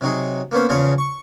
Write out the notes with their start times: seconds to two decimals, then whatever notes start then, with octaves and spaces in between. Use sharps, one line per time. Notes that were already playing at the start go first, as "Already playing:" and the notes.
0.01 C3 F#3 D#4 G#4
0.51 A#3 B3 C#4 C5
0.69 E2 C#3 F3 F4 G#4 C#5
0.98 C#6